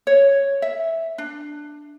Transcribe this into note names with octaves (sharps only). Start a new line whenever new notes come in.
C#5
E5
D4